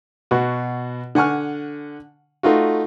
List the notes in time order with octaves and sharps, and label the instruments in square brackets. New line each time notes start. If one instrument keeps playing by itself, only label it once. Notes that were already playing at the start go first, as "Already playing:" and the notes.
[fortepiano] B2 F#4
D3 F#5 G#5 C#6 F6
A3 D#4 F4 F#4